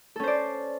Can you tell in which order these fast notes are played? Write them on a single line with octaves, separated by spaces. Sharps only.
A4 C#4 C5 D5